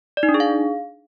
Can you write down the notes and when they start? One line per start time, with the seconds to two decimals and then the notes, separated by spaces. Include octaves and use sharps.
0.17 D5
0.23 D#4
0.29 D4
0.34 G#4
0.40 F5